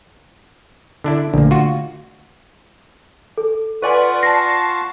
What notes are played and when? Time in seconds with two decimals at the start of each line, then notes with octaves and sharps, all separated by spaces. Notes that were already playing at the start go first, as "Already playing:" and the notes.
1.04 D3 D4 E4
1.34 A#1 D3 A3 A#3
1.51 F4 F#4
3.38 A4
3.82 F4 B4 D5 F#5 G#5 C#6
4.23 A5 A#6 C7